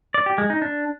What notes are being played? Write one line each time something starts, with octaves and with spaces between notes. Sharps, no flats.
D5
G4
G#3
D#4
D4